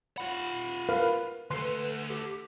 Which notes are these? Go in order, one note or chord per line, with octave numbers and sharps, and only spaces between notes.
F4 F#5 B5
A#4 B4 F5
D2 A4 B4 C6
G4